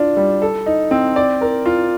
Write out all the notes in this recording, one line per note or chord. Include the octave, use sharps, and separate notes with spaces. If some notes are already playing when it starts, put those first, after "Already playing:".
Already playing: D4 F4
G3
A4
D#4
C4
D5
A#4
F4